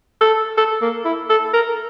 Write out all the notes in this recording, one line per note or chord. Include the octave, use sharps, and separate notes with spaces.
A4
A4
A#3
E4
A4
A#4